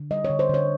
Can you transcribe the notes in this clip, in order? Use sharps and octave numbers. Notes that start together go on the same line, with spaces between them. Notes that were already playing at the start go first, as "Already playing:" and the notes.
Already playing: D3
G3 D#5
C#5
D3
C5
D3 C#5